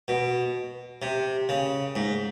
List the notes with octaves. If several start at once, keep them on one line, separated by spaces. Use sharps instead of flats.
B2
C3
C#3
G#2